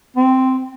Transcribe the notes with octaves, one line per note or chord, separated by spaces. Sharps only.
C4